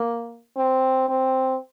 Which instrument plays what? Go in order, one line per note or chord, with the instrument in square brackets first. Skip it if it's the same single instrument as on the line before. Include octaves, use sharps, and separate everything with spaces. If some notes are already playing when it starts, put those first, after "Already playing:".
Already playing: [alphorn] A#3
C4
C4